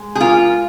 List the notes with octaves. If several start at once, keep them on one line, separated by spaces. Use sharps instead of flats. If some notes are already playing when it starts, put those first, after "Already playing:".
Already playing: G#3
G#4
F4 A#4